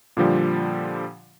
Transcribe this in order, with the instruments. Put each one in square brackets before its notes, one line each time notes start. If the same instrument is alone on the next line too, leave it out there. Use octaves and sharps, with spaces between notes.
[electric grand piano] A#2 D3 F3 G3